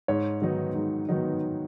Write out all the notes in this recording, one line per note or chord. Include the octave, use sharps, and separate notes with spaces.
G#2 C#5
D#3 F#3 B3 D#4
G#2
D#3 F#3 B3 D#4